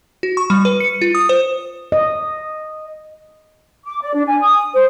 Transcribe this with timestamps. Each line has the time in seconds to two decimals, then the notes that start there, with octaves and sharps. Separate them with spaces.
0.23 F#4
0.37 C#6
0.50 G3
0.65 B4
0.80 C#7
1.02 F4
1.15 D#6
1.29 C5
1.92 D#5
3.85 D6
4.01 D5
4.14 D4
4.26 G#5
4.41 D#6
4.74 C5